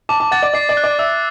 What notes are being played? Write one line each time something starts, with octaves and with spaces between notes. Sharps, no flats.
A5 D6
A5
F#5 A6
D5
D5 C7
D5
F#6
D5
E5 E6